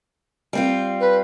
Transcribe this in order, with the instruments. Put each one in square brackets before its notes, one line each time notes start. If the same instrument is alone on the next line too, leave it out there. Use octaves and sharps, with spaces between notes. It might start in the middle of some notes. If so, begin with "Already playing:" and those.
[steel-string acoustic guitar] G3 C4 F4
[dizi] B4